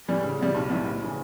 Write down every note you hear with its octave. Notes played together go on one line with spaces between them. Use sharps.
A2 E3 G3
C#3
G3 B3 E4
B1
A2 G3 B3 E4
F#1
C#3 E3